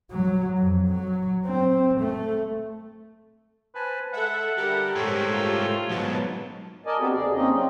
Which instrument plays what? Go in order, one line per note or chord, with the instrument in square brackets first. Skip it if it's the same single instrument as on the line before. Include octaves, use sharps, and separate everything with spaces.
[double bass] F#3
F2
F#3
C4
A3
[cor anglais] B4 [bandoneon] C5 G#5 A5
[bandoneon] G#3 [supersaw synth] A4 E5 [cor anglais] F#5
[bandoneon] D3 G3 [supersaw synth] G4 A4 A#4
[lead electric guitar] G#2 A3 [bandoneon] C#5 C6 E6
[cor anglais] F4
[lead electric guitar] B1 G#2 [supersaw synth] F#3 B3 A5
[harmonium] A#4 D5 D#5 G#5 A5
B3 C4 D4 F#4 G4 A4
D#2 C3 G#4 D5
A#3 C4 C#4 D#4 D#5
F#3 C4